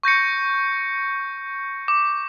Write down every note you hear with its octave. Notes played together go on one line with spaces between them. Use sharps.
C#6 G6 A#6 C#7
D6